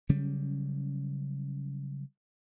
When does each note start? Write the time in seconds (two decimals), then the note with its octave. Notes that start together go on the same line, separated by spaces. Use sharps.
0.09 C#3 F#3 G3 C#4